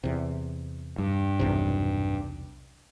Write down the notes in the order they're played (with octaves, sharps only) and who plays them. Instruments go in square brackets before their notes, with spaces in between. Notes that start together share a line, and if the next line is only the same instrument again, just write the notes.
[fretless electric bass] E2 C3
[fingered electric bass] G2
[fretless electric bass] B1 E2 C3